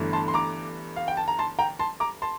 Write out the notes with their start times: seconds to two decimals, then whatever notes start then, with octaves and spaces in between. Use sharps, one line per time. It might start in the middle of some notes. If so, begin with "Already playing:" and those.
Already playing: G1 G2 E3 A3
0.13 A5 C6
0.28 C6
0.34 A#5 D6
0.96 F5
1.08 G5
1.17 A5
1.28 A#5
1.39 A5 C6
1.59 G5 A#5
1.79 A5 C6
2.00 A#5 D6
2.22 A5 C6